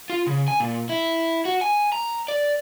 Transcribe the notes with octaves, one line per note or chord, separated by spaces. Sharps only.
F4
C#3
G#5
A#2
E4
F#4
G#5
A#5
D5